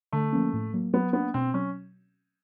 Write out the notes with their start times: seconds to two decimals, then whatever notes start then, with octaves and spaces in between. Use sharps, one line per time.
0.13 D3 A3
0.33 F3 A#3 C#4
0.53 A2
0.74 F#3 A#3
0.94 F#3 B3
1.13 A#3 B3 D4
1.34 B2 C4
1.54 F#3 C#4